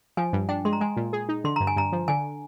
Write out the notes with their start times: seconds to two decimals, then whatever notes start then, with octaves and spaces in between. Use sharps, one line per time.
0.17 F3 G#5
0.33 G2
0.49 D4 G5
0.65 G#3 C6
0.73 A#5
0.80 G#3 G#5
0.97 A#2
1.13 G#4
1.29 D#4
1.44 D3 C6
1.56 G2 A#5
1.67 G#5
1.76 G2 A#5
1.92 F3
2.08 D3 G#5